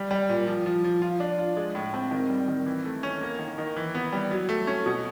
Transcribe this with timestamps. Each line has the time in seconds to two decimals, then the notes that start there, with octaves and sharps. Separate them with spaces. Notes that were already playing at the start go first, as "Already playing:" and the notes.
Already playing: G3
0.11 G3
0.29 A#2
0.47 F3
0.66 F3
0.84 F3
1.02 F4
1.20 D4
1.38 F4
1.57 G#3
1.75 A2
1.94 C4
2.11 D#3
2.30 G3
2.48 D#3
2.66 E3
2.85 A3
3.03 C#4
3.21 A#3
3.39 D#3
3.58 D#3
3.76 E3
3.95 B3
4.12 G3
4.31 F#3
4.49 A3
4.67 C#4
4.86 B2